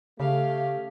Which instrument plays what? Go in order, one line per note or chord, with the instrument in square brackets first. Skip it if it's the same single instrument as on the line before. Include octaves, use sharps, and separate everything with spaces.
[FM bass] C#3 [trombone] A3 [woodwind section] C#4 G4 [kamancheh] F5